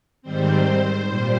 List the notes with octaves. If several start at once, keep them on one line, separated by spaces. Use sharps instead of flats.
G#2 D#3 G3 C4 C5
C5
A#2 G3 C5